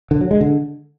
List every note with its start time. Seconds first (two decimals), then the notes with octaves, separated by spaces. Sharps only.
0.11 D3
0.21 F#3
0.31 G#3
0.41 D3